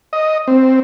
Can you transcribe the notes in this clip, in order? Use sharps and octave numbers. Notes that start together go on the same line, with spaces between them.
D#5
C4